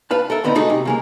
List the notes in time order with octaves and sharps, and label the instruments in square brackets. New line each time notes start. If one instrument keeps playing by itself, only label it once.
[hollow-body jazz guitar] B4 F5 A5
A4 A#4 E5
A2 D3 B3 C4 D#4 E4
G#3 A3 D#4 F#4 G#4 A4
C3
C#3 G#3 A#3